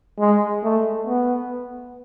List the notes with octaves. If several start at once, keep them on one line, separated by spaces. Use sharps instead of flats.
G#3
A3
B3